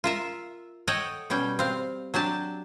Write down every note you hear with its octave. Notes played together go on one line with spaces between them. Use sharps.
F4 A#4 E5
A4 C#5 D#5 F#5 G5
B2 G3 C#4 G5
C4 F5
F#3 D4 G4 A5